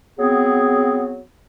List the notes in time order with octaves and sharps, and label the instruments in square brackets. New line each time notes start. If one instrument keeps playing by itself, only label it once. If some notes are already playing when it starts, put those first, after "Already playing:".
[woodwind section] F#3 B3 C4 G#4